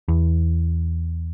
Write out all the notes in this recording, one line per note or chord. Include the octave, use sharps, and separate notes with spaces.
E2